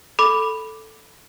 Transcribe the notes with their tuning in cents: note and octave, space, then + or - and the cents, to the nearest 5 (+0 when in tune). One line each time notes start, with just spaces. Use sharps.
A4 +0 B5 +0 D6 +0